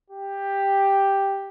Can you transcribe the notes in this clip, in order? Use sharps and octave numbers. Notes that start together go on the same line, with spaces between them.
G4